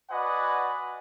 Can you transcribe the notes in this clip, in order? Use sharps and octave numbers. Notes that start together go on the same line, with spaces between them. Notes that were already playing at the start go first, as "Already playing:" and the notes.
F#4 B4 D5 D#5 F#5 G#5